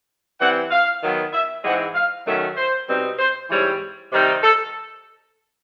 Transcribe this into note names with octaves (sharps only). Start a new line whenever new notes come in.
E3 G3 C4 F#5
F5
D#3 F#3 B3
E5
G#2 E3 G#3 C4 F#5
F5
D#3 F#3 A3 C#4 E5
C5
B2 G3 C4 D#4
C5
G#2 E3 G3 C4 C#5
C3 D#3 G3 C4 D#4
A4